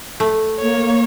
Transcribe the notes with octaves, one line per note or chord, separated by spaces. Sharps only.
A3
A#3 C#5